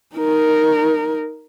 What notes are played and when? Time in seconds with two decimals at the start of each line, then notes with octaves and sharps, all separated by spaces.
0.16 D#4 A#4